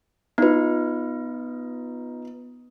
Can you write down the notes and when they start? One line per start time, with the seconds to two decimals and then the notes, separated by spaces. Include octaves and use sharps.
0.38 B3 D#4 F4 B4